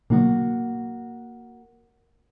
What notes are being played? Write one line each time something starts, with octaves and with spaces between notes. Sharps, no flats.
B2 D3 F#3 A#3 F#4